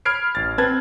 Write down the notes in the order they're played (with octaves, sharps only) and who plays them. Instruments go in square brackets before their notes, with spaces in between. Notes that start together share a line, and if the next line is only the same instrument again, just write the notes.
[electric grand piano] B5 F6 G#6 C7 D7
A1 A6
C4 B4 A5 G#6 A6